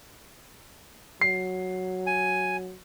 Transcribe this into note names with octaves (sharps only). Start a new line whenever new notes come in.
F#3 C7
G#5